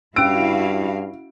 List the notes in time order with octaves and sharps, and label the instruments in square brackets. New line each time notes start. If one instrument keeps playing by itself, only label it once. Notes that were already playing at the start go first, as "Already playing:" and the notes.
[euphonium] G2 [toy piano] C#4 E6 [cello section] E4 F#4 F5 [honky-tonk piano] D7